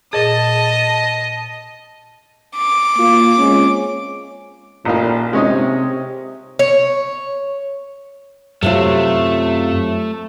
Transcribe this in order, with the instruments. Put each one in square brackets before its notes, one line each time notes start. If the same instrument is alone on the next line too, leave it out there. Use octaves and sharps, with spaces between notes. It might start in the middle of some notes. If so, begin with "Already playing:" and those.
[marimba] A#2 G#4 [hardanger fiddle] D#5 [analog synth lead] A5
[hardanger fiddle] D6
[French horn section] A#3 F4
G#3 C4 C#4
[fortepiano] A1 D#4 F4 [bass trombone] A#2
[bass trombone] C3 [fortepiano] G#3 C#4 D#4
[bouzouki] C#5
[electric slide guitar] F#2 F4 [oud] C3 F#3 C4 [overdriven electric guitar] A3 [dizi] E5